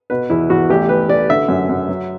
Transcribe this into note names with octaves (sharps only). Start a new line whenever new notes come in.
B2 B4
E2 E4
E2 F#4
A1 G4
A1 B4
A1 D5
D3 E5
F#2
F#2
F#3